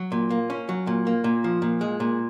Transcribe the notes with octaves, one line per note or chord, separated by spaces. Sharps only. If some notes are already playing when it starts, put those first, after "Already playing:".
Already playing: F#3
A#2
A#3
C#4
F#3
A#2
A#3
A#2
F3
A#2
G#3
A#2